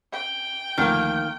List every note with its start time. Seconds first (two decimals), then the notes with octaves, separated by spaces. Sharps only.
0.13 G5
0.78 D2 D#3 F3 A#3 F#5